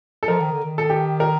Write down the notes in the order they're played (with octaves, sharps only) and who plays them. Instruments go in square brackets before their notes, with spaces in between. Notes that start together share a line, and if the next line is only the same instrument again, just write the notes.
[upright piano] A4
[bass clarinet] F3 [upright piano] A#4
[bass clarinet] D#3
D3
D#3
[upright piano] A4
G4
A#4